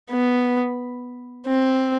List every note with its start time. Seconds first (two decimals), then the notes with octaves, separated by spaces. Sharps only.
0.11 B3
1.48 C4